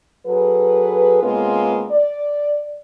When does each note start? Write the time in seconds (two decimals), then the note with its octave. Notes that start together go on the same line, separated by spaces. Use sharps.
0.27 F#3 G#4 A4 B4
1.23 C3 G#3 A#3 B3 C#4 F4
1.92 D5